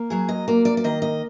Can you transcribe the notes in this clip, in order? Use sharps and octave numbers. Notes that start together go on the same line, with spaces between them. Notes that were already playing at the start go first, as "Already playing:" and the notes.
Already playing: A#3
F#3 G#4
D#5
A#3 D5
D5
D5
D#3 D#5
D#5